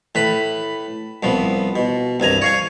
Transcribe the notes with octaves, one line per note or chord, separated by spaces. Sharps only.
A2 B4 B5
C2 F3 B3
B2
C2 G2 G#5 A#5
C#5 F5 G#5